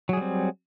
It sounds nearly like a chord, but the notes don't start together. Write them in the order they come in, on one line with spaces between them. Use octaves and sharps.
F#3 G#4 G3 C4